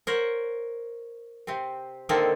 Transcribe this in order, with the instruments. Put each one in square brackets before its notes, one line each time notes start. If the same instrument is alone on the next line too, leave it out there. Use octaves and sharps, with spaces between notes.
[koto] A#4 C5 C#5 F#5
C3 C4
D3 D#3 A#3 C4 A4 C5